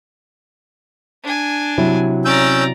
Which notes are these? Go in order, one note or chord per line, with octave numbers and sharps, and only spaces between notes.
D4 G#5
C3 F#3 E4
C#4 D5 A#5 E6 G6